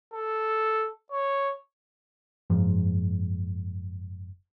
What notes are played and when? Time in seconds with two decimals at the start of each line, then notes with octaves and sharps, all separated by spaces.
0.13 A4
1.12 C#5
2.50 F#1 G#2 F3